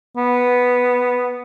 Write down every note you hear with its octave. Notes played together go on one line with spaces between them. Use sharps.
B3